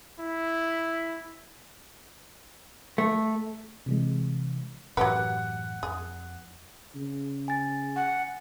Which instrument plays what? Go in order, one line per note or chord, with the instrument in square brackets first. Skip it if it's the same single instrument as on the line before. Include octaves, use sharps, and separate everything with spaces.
[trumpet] E4
[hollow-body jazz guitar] A3
[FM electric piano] C3 E3 G#3
[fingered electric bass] F#2 A2 E3 [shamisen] F#3 G4 B4 [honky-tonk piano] F#5
[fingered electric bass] F2 [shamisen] G#4
[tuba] C#3
[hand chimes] G#5 A6
[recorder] F#5